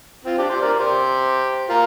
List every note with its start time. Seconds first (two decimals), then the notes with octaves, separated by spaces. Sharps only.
0.25 C4 F4
0.38 D4 G4
0.50 G4 C5
0.61 A#4 D5
0.79 G4 C5
1.69 F4 A#4